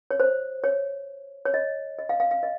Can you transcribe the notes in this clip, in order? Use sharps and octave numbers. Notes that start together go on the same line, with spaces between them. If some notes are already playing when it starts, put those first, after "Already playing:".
C#5
C5
C#5
C#5
D#5
D#5
F5
F5
F5
D#5